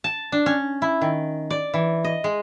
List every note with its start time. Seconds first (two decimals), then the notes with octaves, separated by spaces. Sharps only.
0.04 A5
0.32 D4
0.46 C#4
0.82 E4
1.02 D#3
1.51 D5
1.74 E3
2.05 D#5
2.24 G#3